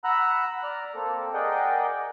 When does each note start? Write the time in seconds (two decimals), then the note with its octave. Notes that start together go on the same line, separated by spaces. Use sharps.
0.04 F#5 A#5 B5 E6 F#6
0.63 D5 A#5 F6
0.95 A#3 C4 A4
1.34 G#4 A#4 D5 D#5 F#5 G5